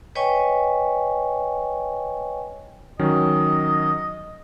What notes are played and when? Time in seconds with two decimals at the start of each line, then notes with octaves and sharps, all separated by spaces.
0.15 B4 C#5 D#5 G5 G#5 C#6
2.99 D#3 F#3 C#4 D#5